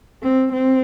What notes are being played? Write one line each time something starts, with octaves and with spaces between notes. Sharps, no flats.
C4
C4